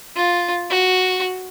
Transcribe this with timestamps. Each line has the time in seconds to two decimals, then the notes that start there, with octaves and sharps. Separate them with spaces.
0.16 F4
0.70 F#4